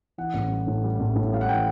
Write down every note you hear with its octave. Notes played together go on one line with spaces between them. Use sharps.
E3 F#5
A1
G3
A2
G3
A1
A2
G3 F5
F#5
E3 G5